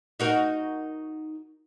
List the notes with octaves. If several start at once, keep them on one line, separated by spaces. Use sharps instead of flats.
D#4 F#4 A#4